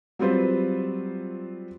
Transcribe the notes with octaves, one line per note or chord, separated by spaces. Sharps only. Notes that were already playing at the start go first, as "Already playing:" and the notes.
F#3 G3 C4 F4 B4 C5